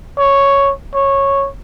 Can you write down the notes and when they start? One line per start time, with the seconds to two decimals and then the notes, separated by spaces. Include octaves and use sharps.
0.18 C#5
0.95 C#5